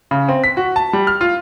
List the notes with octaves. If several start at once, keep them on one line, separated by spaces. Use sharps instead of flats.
C#3
C4
B6
F#4
A5
G3
F6
F4